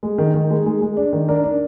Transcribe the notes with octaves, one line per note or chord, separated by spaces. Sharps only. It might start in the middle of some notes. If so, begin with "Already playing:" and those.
G#3
D#3
D#3
G#3
G#3
G#3
D4
D#3
D4 A#4
D4